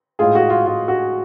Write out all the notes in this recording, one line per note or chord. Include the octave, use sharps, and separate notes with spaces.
A2 G#3 F4 G#4
F#4
F4
A2 G#3 F4
F#4